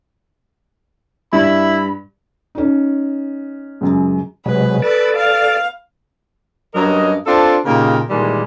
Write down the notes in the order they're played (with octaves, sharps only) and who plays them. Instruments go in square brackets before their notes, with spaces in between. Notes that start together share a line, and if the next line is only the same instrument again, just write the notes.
[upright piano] G2 [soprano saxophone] E4 [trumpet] B5
[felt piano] C#4 D#4
[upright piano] C#2 F#2
[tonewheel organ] C3 F#3 G#3 [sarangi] B4
[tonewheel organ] A4 D5 [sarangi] B4
[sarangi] F5
[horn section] G2 F#3 C#4 A#4 D#5
C4 D4 F4 A4 D5 A5
A#2 C#3 A#3 D#4 G4 A#4
A#2 D#3 E3 G3 G#3 A#3